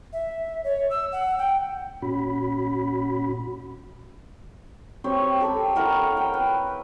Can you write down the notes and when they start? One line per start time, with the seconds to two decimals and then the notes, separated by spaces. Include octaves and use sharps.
0.13 E5
0.64 C#5
0.90 E6
1.12 F#5
1.38 G5
2.02 A#2 C#4 F#4 B5
5.04 C4 G4 B4 C#5
5.40 G4 A4 A#4 B5
5.75 E4 A#4 F#5 C#6
6.17 G5
6.34 B4